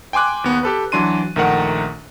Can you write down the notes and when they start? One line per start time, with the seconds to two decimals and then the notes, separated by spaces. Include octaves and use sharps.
0.13 G5 G#5 C6 D6 F#6
0.44 D#2 B3
0.63 G4 A4 B4
0.92 E3 F#3 D4 C6 D#7
1.36 A#1 D#3 A3 A#4 F#5